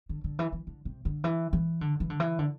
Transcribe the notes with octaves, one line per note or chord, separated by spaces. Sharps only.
D3
D3
E3
E3
D3
C3
D3
E3
E3
D3
E3
D3
E3
D3